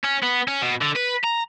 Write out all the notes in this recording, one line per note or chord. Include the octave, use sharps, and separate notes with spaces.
C#4
B3
C#4
B2
D3
B4
A#5